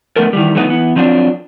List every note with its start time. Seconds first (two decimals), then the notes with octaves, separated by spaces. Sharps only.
0.16 D3 F3 A3 B3 A4 A#4
0.33 D#3 E3 G3
0.55 D3 F3 A3 B3 C#4 D#4
0.69 E3 B3
0.96 F3 F#3 C4 D4 F4